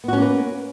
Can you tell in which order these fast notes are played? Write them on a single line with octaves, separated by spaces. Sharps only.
B3 F#4 C#4 A#3 B4